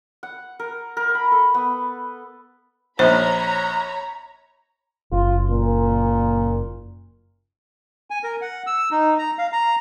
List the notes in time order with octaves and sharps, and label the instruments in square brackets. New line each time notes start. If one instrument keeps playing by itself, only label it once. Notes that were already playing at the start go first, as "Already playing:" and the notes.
[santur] F#5
A#4
A#4
B5
A4
B3
[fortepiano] A#1 [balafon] C5 [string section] C#5 A#5 B5
[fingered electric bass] F#1 [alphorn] F4
[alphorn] A#2
[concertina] G#5
A#4
F#5
E6
D#4
A#5
F5
A#5